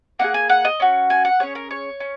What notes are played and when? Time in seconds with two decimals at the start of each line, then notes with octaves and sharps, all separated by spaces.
0.19 A#3 D#4 F#5
0.24 G#4
0.34 G#5
0.50 F#5
0.65 D#5
0.80 C#4 F#4
1.10 G#5
1.25 F#5
1.40 C#4 G#4 C#5
1.55 A#4
1.71 C#5
2.00 C#4